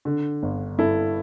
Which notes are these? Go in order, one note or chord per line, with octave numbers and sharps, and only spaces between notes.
D3
G1
G2 E4 A4